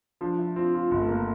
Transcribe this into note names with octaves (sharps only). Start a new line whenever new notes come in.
F3 D4
E4
C4 F4
F4
G1
A3
A#3